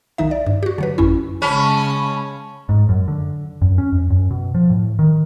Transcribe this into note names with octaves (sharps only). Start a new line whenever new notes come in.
B1 D#3 D#4 E5
D5
G2
F#4 G4
D3 F#3 B4
A1 F#2 C#4 E4
C#3 G#3 C#4 A5 B5
G#2
F#2
D3
F#2
C#4
F2
F#2
B2
F3
A2
D#3